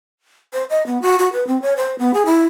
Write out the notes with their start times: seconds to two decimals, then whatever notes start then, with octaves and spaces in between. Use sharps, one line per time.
0.53 C5
0.70 D#5
0.86 B3
1.02 F#4
1.19 F#4
1.33 B4
1.47 C4
1.62 C#5
1.77 C5
1.99 B3
2.14 G#4
2.26 E4